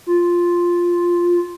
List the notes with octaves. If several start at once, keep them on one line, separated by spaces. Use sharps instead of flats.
F4